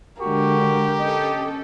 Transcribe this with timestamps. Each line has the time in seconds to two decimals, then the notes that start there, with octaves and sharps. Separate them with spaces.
0.21 D3 G#3 F#4 G4 A#4
1.00 C#4 A4 D#5